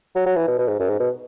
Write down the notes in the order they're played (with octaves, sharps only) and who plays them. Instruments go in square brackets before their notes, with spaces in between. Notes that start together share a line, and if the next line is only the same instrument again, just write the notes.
[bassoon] F#3
F#3
E3
B2
B2
G#2
F#2
G#2
B2